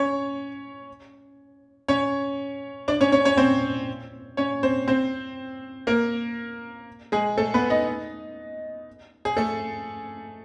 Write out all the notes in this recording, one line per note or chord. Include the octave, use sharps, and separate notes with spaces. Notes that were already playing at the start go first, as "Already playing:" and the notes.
Already playing: C#4 C#5
C#4 C#5
D4 D5
C#4 C#5
C#4 C#5
C#4 C#5
C4 C5
C#4 C#5
C4 C5
C4 C5
A#3 A#4
G#3 G#4
A3 A4
B3 B4
D#4 D#5
G#4
A3 A4